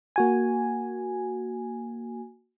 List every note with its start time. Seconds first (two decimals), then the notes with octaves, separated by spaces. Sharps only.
0.16 A#3 F#4 G#5